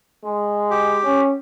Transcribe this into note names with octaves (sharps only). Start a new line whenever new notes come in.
G#3
G4
C#4